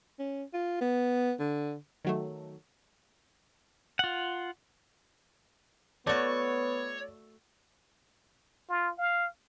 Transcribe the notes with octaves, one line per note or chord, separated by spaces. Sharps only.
C#4
F4
B3
D3
D#3 F#3 A3
F4 F#5
A3 B3 F#4 C#5 D5
F4
F5